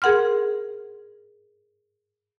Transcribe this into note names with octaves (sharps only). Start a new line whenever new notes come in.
G#4 A#4 F#5 C6 F6